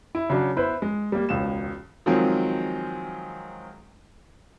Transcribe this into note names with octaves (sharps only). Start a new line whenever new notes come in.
E4
C#3 F#3 D4
B3 E4 B4 C5
G#3
G3 A#3
E1 C#2 E7
D#3 F3 F#3 G#3 C4